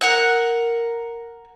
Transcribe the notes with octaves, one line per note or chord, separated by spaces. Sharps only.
A#4 F#5 F#6